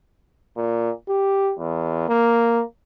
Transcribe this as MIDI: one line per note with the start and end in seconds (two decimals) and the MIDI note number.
0.57 0.91 46
1.09 1.54 67
1.59 2.05 40
2.09 2.63 58